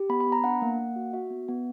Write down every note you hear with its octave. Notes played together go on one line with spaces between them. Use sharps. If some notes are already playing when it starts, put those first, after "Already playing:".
Already playing: G4
B3 B5
B5
B3
A#5
D4 F#5
A#3
A#3
F#4
F#4 E5
B3
B3